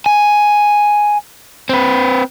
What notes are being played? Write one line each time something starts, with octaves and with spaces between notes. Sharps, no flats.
G#5
C4 B4